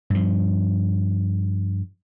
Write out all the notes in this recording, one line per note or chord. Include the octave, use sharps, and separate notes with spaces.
G2 F3